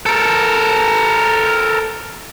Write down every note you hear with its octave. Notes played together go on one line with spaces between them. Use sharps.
A4 A#4